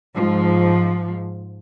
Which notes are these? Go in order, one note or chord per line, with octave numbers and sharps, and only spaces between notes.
G#2 F3